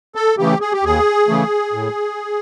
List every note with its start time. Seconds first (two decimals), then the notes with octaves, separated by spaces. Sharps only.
0.15 A4
0.38 C#3 E3 A3 G4
0.61 G#4
0.72 G4
0.84 D#2 G#4
1.28 C#3 E3 A3
1.73 A2